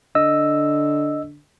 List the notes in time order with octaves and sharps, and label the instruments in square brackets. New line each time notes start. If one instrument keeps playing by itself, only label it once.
[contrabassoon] D3 [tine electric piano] D#5 E6